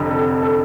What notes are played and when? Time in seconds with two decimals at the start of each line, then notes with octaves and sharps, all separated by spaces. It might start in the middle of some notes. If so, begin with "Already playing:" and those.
Already playing: F1 F2 D3
0.09 A4
0.42 A4